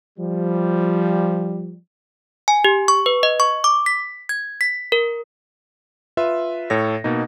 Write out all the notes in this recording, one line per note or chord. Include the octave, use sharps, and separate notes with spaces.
F3 G3
G#5
G4
C#6
B4
D#5
C#6
D6
B6
G#6
B6
A#4
F4 B4 E5
A2 A4 C#5 A#6
B2 A#3 D#4